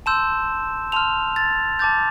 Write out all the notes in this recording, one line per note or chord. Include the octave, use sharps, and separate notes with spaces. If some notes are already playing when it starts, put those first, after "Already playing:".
A5 C6 E6 G6 E7
A5 C6 F6 F7
A6
A5 D6 G6 A6